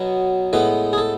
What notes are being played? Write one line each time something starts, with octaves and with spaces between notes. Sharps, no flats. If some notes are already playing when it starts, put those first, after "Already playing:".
Already playing: B2 F#3 B3
A2 G#3 B3 B4
G#4
A4